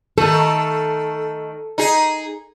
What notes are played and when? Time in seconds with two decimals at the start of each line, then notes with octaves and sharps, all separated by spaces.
0.18 D#3 A3 A4
1.78 D#4 G#4